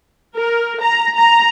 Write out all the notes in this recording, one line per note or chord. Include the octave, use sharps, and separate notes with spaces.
A#4
A#5
A#5